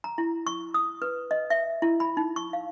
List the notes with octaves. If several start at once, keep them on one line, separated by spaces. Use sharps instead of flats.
A#5
E4
C#6
D#6
B4
D#5
E5
E4
B5
D#4
C#6
F5